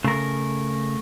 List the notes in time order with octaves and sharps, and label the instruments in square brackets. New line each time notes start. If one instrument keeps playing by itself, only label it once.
[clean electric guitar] C#3 [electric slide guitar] A3 A#4